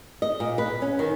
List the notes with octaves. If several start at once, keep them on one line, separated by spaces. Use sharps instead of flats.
D#5
A#2
B4
C#4
D#3